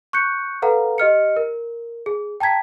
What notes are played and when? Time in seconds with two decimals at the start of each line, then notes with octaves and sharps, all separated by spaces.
0.13 C#6 F#6 G6 C#7
0.62 A4 B4 F5 F#5 A#5
0.98 G4 D#5 F6 C#7
1.36 A#4
2.06 G#4
2.40 G5 A5 A#5 G#6 B6